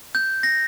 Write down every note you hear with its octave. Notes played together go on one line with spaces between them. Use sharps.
G6
A#6